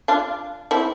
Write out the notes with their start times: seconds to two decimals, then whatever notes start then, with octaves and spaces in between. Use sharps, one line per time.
0.08 D4 F4
0.71 C4 E4